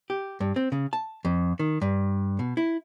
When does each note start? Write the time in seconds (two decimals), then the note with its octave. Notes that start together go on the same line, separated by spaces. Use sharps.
0.10 G4
0.40 G2
0.56 C4
0.72 C#3
0.93 A5
1.25 F2
1.59 D#3
1.82 G2
2.39 B2
2.57 E4